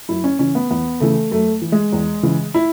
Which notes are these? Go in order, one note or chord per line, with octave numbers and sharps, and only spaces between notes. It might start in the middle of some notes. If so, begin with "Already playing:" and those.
F#2 E4
C#4
C#3 E3 C#4
B3
E2 B3
C#3 E3 A3
F#2 A3
E3
G#3
E2
C#3 E3
E4